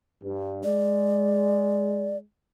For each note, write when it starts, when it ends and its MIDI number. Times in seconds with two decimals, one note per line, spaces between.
0.23 0.61 43
0.64 2.21 56
0.64 2.17 74